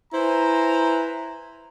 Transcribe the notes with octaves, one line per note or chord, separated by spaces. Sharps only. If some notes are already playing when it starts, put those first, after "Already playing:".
E4 B4 C5 G#5 A#5